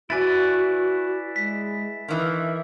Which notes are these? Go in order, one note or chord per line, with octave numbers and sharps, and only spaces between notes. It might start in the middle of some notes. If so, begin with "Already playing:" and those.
E4 F#4 B4 D5 G#5 A6
G#3 B6
D#3 E3 E5